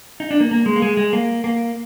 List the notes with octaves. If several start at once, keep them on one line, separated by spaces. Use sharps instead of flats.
D#4
D4
A#3
A#3
G#3
A#3
G#3
G#3
A#3
A#3